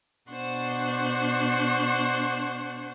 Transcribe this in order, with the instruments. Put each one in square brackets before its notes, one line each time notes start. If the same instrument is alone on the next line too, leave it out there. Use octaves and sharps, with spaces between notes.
[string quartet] B2 D4 C5 F#5 C#6